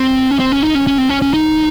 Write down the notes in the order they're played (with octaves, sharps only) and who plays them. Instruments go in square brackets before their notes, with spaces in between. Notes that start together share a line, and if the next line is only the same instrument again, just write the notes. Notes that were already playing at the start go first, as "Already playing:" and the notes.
Already playing: [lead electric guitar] C4
C#4
C4
C#4
D#4
C#4
C#4
C4
C#4
C#4
D#4